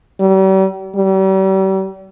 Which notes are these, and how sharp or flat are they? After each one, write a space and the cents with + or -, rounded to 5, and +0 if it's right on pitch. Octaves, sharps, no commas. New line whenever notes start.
G3 -40
G3 -40